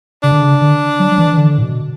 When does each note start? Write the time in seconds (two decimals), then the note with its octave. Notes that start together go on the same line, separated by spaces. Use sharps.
0.23 C#3 D4
0.31 D3
0.40 C#3
0.61 D3
0.99 F#3
1.11 F#3
1.18 E3
1.32 E3
1.38 D3
1.58 A2
1.62 B2